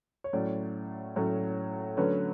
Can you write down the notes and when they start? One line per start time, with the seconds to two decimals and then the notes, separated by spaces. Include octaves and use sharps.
0.24 C#5
0.33 A2 F#3 A3 C#4 D5
1.16 A2 F#3 A3 C#4
1.97 D3 F#3 A3 C#4 B4